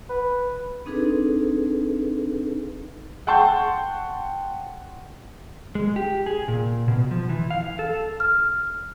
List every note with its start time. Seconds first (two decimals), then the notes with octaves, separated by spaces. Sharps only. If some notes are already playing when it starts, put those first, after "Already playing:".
0.10 B4
0.86 C4 D4 D#4 G#4 A4 B4
3.27 F#5 G5 A5 C6 C#6 G6
5.75 G#3
5.96 G4
6.26 G#4
6.48 A#2
6.88 B2
7.11 F3
7.29 E3
7.51 F5
7.79 A4
8.20 F6